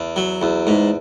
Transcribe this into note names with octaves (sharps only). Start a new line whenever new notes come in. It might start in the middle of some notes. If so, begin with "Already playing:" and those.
Already playing: E2
F#3
E2
G#2